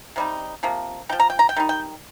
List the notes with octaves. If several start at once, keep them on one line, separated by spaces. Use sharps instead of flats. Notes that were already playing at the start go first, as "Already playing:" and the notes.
C3 G3 D#4
C3 F3 A#3
F3 D#4 G5
A#5
G5
A#5
G5
D#3 G3 D#4
G5